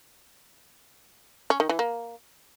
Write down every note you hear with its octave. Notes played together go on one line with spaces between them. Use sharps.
C#4
D#3
E3
A#3